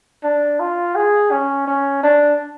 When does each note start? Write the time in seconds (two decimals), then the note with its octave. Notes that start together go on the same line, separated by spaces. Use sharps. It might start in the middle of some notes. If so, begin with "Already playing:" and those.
0.24 D4
0.60 F4
0.96 G#4
1.31 C#4
1.67 C#4
2.03 D4